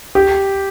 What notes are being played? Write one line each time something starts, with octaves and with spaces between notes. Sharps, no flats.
G4